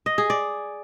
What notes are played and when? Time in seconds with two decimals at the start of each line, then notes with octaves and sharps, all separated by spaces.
0.06 D#5
0.18 G#4
0.30 D5